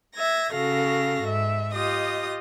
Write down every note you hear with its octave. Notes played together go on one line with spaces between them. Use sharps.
E5 G#6 A#6
C#3 F#4 A4 F5 A#6
G#2 E5
F4 G4 D#5 D#6